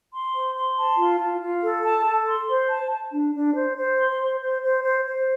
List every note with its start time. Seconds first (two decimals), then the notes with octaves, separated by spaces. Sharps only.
0.12 C6
0.33 C5
0.55 C6
0.76 A5
0.98 F4
1.19 F4
1.40 F4
1.62 A4
1.83 A5
2.05 A4
2.26 C6
2.47 C5
2.69 A5
2.91 A5
3.12 D4
3.33 D4
3.55 C5
3.76 C5
3.97 C6
4.19 C5
4.40 C5
4.62 C5
4.83 C5
5.04 C5